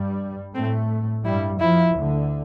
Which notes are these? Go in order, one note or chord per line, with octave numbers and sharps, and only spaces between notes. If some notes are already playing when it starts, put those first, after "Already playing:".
Already playing: G2 G3
A2 A3 C4
G2 G3 E4
F2 F3 E4
D2 D3